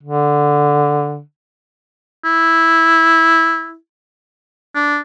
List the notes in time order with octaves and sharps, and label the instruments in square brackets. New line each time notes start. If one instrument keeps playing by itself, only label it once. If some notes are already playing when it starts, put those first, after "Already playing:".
[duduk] D3
[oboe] E4
D4